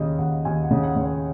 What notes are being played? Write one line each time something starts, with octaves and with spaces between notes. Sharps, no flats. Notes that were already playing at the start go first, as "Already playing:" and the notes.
Already playing: D#2 C#3 D#5
D#2 F#5
D#2 G#5
F#5
C#3
F#5
C#3
C#5